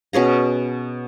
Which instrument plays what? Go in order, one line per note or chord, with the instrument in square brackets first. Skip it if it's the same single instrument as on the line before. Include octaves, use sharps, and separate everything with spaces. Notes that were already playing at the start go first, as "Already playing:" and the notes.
[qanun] B2 C#4 G#4 A#5